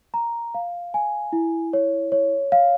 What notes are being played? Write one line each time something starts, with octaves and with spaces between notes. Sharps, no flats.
A#5
F5
G#5
E4
C#5
C#5
F5